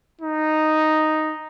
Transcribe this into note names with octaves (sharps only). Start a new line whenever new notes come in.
D#4